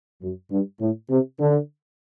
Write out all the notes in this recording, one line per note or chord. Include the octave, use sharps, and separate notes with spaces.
F#2
G2
A2
C3
D3